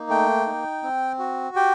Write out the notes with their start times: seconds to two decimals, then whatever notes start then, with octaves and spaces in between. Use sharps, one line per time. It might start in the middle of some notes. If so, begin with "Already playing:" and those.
Already playing: A#3 D#4
0.09 A3 G5
0.46 D#4
0.83 C4
1.19 F#4
1.56 G4 G5